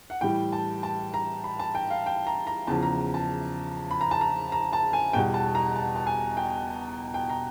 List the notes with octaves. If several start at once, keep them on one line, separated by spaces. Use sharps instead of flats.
F#5
A2 E3 G3 G5
A5
A5
A#5
B5
A5
G5
F5
G5
A#5
A#5
E2 C#3 F3 A5
A#5
A5
B5
A#5
A5
A#5
A#5
A5
G#5
E2 B2 G3 G5
A5
A#5
A5
A5
G#5
G5
G5
A#5